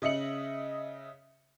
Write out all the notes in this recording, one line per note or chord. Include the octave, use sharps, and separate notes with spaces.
C#3 D#5 E5 C#7 F#7